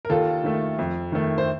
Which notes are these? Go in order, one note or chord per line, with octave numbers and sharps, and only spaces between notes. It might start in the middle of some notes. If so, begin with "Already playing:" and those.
A#4
D#2 F4 A4
D#3 A3
F2
D#3 A3
C5